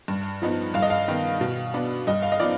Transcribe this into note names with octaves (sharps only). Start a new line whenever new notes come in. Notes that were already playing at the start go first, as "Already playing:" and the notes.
G2
F3 B3 D#4
G2 F5
D#5
F5
D#3 B3
B2
B3 D4
G2 D#5
F5
D#5
F3 B3 D#4 D5